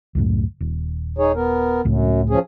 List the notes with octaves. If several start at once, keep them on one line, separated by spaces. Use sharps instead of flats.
C#2 F#2 A2
D#1
D#4 G#4 C#5
B3 A#4
C#2 F#2 A2
F3 C#4 G#4